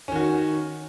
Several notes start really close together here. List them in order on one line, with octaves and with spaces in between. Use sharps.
C#4 D#3 F#4